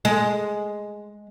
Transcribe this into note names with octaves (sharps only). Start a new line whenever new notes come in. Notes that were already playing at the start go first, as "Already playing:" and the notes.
G#3